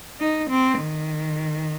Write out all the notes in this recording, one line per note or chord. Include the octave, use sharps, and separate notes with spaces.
D#4
C4
D#3